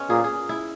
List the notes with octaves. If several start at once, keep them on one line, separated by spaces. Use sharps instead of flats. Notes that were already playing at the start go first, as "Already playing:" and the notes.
Already playing: G#3 B3 C#4
A#2 G#4
G#4
E4